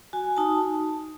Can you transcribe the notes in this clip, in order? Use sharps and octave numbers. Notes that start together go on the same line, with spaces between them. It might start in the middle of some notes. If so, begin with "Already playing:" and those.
F#4 G#5
D#4 A5